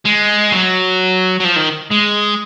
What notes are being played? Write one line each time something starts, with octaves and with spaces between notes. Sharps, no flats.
G#3
F#3
F#3
F3
D#3
G#3